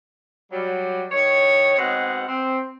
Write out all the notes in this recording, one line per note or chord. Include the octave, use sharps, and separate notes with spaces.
F#3 G3
D#3 C#5
G#2 B2 G#3 C4 F#5
C4